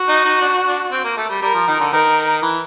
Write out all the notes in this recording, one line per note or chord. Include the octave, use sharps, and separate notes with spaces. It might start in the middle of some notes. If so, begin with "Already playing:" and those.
Already playing: F#4
D#4
D#4
D4
D4
C4
A#3
A3
G3
G3 A#4
F3
D#3
D3
D#3 A#4
E3